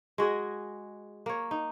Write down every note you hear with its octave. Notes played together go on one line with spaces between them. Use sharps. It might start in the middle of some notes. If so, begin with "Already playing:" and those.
G#3 F#4 G#4 D#5
A#3 C#5
D#4